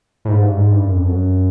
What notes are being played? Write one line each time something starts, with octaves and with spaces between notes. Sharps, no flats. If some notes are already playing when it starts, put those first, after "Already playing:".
A2
G#2
G2
G#2
G2
F#2
F2
F#2